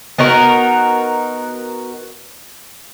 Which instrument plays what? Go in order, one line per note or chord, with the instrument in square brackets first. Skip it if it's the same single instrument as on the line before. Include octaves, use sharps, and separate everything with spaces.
[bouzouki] B3 D#4 F#4 A#4